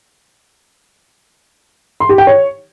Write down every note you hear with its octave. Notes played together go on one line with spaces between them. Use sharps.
C6
G4
G5
C#5